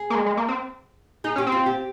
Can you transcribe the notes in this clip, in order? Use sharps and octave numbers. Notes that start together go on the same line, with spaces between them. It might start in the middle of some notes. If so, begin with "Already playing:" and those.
Already playing: G#4
A#3
G#3
G#3
A#3
C4
D#4 G#4
C#4
G4
C4
F4
G4